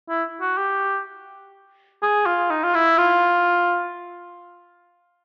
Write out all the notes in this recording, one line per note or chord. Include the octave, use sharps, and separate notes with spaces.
E4
F#4
G4
G#4
F4
D#4
F4
E4
F4